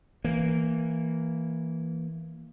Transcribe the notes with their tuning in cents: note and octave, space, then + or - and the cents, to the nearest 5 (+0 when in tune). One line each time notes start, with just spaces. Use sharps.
E3 +0 A#3 -10